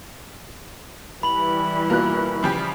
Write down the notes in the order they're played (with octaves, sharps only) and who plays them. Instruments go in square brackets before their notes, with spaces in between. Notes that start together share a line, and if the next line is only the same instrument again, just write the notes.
[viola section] E3 G3 [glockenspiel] B5 F#7
[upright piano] B2 A#3 F4 [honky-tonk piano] A#4 F#6
[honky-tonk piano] C#3 F3 G4